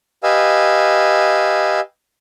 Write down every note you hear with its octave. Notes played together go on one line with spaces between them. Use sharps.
G4 B4 D#5 F5 G#5 E6